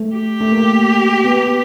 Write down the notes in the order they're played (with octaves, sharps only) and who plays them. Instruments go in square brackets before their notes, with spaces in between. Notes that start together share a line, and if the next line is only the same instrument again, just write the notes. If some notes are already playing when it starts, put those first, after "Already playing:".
Already playing: [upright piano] A3
[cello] G4
[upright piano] A3
A#3
B3